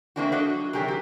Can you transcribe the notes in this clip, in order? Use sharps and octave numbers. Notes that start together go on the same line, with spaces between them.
G#3 A#3 C4 D4 E4 F#4
D4 F#4 A4 D#5
F#3
C3 D#3 F#3 G4 G#4 A#4
C4 G4